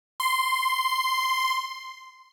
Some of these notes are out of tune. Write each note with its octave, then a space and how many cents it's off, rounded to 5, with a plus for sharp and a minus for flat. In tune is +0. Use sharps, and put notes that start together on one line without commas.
C6 -5